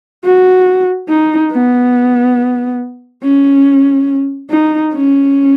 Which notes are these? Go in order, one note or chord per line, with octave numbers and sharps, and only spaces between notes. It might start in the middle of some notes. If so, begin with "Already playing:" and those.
F#4
D#4
B3
C#4
D#4
C#4